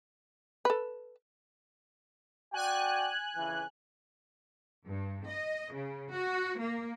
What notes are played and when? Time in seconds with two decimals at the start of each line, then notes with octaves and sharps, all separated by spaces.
0.65 A4 B4
2.54 F#4 D5 G5 G#5 F#6
3.36 F2 C#3 E3
4.87 G2
5.27 D#5
5.74 C#3
6.13 F#4
6.59 A#3